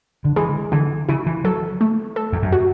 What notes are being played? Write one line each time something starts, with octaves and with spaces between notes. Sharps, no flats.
D3
E3 G#3
D3 E3
C#3 E4
E3
F#3 A4
A3
A4
E2
F#2
F#4